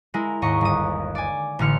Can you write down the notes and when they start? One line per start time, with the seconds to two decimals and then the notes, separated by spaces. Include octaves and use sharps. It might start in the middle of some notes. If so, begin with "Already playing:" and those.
0.14 G#3 E4 A#4
0.42 D#2 G#2 D#5 A#5 C#6
0.61 G1 D#6
1.15 D5 G#5
1.59 A1 D3 F6 C#7